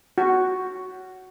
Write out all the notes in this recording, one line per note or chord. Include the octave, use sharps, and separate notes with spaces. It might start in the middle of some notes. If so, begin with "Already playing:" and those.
F#4